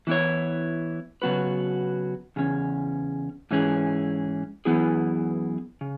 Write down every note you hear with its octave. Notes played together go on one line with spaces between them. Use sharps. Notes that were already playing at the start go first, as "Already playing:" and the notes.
E3 B3 E4 C#5
C#3 F#3 B3 F#4 B4
E2 C#3 C#4
G#2 E3 C#4 G#4
F#2 E3 B3 E4 G#4
C#3